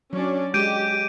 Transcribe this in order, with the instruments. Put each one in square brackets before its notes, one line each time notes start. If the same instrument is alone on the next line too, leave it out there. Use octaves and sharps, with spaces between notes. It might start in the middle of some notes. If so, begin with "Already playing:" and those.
[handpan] F#3 [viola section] C#4 D4 D5
[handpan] G#3 [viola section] G4 [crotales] G6 D7 D#7